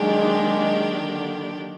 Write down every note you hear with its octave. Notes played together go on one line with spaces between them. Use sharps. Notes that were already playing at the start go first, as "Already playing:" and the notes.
Already playing: D#3 F#3 G#3 A#3 D4 G4
D3